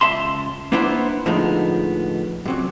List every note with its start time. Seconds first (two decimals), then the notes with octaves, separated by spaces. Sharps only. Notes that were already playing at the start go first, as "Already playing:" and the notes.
0.01 C#2 E5 A5 C6
0.72 A#3 B3 D4 E4 C5
1.26 A2 D3 F3 G#3 B3 D#4
2.46 F#2 C3 F#3